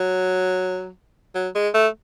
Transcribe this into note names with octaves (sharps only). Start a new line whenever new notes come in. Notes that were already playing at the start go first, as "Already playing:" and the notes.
Already playing: F#3
F#3
G#3
A3